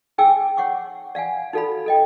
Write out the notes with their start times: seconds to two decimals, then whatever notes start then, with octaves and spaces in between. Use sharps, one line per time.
0.18 D#4 G#4 G5 G#5 D6 E6
0.57 C#5 F#5 C#6 D6
1.15 D5 F5 F#5 G#5
1.53 D#4 F#4 A4 D5 F5 B5
1.86 A4 D#5 G5